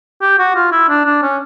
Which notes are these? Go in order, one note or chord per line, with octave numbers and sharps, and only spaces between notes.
G4
F#4
F4
E4
D4
D4
C#4